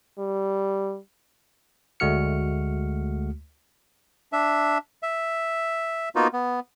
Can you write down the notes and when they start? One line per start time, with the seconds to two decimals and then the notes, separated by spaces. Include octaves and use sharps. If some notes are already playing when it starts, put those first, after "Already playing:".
0.19 G3
2.00 D2 G#3 A3 F#4 F6 C#7
4.33 D4 E5
5.03 E5
6.16 A#3 B3 D#4 F4 F#4
6.33 B3